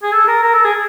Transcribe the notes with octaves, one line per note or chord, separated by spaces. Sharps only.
G#4
A4
A#4
A#4
A4
G#4